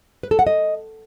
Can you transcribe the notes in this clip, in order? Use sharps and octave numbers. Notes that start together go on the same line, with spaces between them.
B4
A4
F#5
D#5